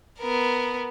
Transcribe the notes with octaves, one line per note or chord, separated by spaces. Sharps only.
B3 A#4